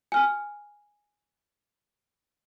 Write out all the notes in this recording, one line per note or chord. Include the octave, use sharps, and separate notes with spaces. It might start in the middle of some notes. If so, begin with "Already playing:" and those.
G#5 F6